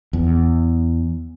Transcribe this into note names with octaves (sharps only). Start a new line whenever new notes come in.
E2